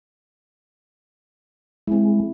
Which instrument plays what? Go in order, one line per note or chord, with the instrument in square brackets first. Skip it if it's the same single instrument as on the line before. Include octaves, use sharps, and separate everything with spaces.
[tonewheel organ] G#3 [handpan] C4 E4